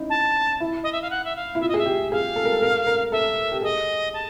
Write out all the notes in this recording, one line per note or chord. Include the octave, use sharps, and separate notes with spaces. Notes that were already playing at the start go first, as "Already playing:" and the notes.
Already playing: C#4 D#4 E4
A5
E4
D#5
E5
F5
F#5
E5
F5
E4
F4 E5
D#5
G#4 E5
G4
G#4 F5
A4
A#4
A4
A#4
A#4
A4 E5
G4
G#4 D#5
A5